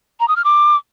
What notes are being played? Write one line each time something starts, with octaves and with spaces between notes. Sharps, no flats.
A#5
D#6
F6
D6